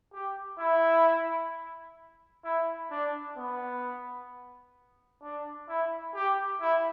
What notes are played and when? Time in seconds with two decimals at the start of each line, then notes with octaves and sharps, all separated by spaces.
0.13 G4
0.59 E4
2.45 E4
2.91 D4
3.37 B3
5.22 D4
5.68 E4
6.15 G4
6.61 E4